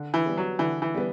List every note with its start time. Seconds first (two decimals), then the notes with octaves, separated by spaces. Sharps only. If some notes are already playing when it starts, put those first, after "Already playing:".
Already playing: D3
0.14 E3
0.26 G3 B3
0.37 F#3
0.59 D3 E3
0.82 E3
0.94 G3 B3